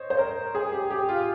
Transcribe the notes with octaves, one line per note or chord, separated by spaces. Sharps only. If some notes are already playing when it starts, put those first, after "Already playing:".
Already playing: C5 C#5 D#5
C5
A#4
G#4
G4
G4
F4